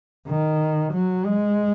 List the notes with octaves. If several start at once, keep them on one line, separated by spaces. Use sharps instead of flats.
D#3
F#3
G#3